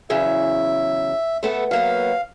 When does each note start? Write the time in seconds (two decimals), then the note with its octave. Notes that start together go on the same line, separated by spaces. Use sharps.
0.10 E2 C#3 F#3 E5
1.43 A3 B3 A4
1.71 F#3 A#3 B3 F5